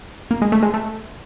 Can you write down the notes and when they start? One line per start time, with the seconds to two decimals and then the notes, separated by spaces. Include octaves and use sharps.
0.31 A#3
0.42 G#3
0.52 A3
0.63 G#3
0.74 A3